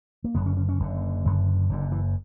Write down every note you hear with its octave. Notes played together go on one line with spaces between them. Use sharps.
A#3
F#1 F#2 D3 B3
C#4
C#4
C#4
F#1 F#2 D3
F#1 F#2 D3
F#1 F#2 D3
E3